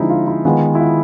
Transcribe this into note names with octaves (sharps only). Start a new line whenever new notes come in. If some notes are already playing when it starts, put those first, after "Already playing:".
Already playing: D3 F3 G#3 C4 D#4 E4
F4
E4
D#3 G#3 B3 F4
E4
F4